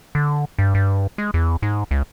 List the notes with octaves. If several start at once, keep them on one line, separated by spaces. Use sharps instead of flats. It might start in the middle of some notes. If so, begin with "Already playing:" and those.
D3
G2
G2
G#3
E2
G#2
C#2